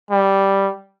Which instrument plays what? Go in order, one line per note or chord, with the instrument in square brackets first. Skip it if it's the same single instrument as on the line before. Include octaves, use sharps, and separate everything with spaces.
[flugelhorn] G3